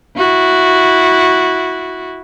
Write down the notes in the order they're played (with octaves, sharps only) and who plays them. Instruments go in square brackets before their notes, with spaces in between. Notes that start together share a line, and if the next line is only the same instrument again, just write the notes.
[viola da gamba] E4 F#4